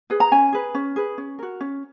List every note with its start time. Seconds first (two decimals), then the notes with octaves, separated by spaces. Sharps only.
0.10 G#4 B4
0.20 A#5
0.32 C#4 G#5
0.53 G#4 B4
0.75 C#4
0.96 G#4 B4
1.18 C#4
1.39 F#4 A#4
1.61 C#4